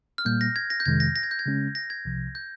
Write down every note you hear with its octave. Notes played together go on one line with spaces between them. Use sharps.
F6
A#2 G3 A#3 G6
A#6
G#6
A#6
G6
F2 C3 D#3 G#3 G#6
A#6
A#6
G#6
G6
G#6
C#3 G#3 C#4
A#6
G#6
C2 C3 F3
G6